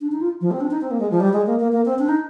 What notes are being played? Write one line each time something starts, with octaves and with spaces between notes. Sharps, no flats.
D4
D#4
F4
F3
C4
D4
D#4
C4
A#3
G#3
F3
G3
G#3
A#3
A#3
A#3
C4
D4
D#4